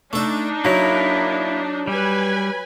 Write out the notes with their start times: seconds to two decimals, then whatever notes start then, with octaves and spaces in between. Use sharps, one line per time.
0.13 A3 D4 D#4 E5
0.65 F#3 A#3 E4 A#4
1.87 G3 B4 G#5 B5